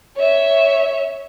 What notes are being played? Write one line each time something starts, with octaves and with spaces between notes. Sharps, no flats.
C#5 E5